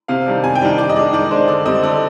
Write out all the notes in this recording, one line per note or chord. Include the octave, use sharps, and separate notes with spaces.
C3 F5
D#3 G3 D4
C3 G#5
G5
D#3 G3 D4
D#3 D5
D#5
G#3 D4 D5
D#3 D5
G#3 D4 C5
D3 D5
G3 C4 D#5
D3 D5